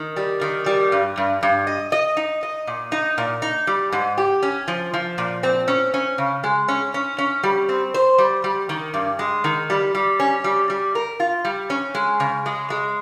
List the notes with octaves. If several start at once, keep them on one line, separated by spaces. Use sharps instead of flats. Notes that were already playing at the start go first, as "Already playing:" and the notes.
Already playing: D#3
G3
D#3
G3
G2
G2
G2
D#5
D#5
D#4
D#5
A#2
D#4
A#2
D#4
G3
G#2
G4
C#4
F3
F3
A#2
C4
C#4
C#4
C#3
G#3
C#4
C#4
C#4
G3
C4
C5
G3
G3
D#3
G2
G#3
D#3
G3
G3
C#4
G3
G3
A#4
F4
G3
C#4
G#3
C#3
G#3
G#3